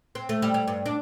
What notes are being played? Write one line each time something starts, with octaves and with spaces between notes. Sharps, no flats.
C4
A3
G3
G3
G2
D4